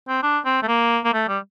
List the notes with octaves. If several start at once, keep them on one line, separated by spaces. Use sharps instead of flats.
C4
D4
C4
A3
A#3
A#3
A3
G3